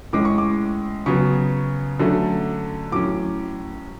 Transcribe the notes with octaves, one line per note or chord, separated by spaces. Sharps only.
A2 G#3 C#4 D6
C#6
D6
C#3 F#3 B3 C#6
D3 F#3 A3 C#4
A2 F#3 C#4 D6